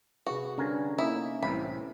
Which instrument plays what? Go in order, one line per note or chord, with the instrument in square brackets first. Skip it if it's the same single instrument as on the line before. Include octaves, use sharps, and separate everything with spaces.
[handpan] C3 G#4 B4 [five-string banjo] F#4
[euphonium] G2 [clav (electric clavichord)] D3 A#4 G#5 [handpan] C#4
[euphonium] A#3 [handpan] B3 C#4 [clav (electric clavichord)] D#4 [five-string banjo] E4
[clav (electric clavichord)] C2 A2 C3 [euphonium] E3 [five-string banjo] B5